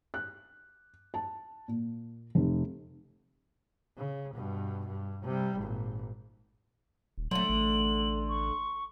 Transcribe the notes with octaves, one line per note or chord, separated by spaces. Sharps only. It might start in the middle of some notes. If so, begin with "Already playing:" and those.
F#6
A5
A#2
F1
C#3
G2 B2
G2
C3 G3
G#1 A#2
D#1
D3 F#3 A3 C6 F#7
A1
C#6